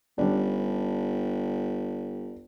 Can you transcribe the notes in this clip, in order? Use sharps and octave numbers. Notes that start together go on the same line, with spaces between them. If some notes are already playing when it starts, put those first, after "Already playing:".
G1 G3 C#4 D4